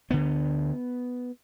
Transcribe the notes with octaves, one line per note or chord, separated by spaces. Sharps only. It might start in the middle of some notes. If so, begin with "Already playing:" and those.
D2 D3 B3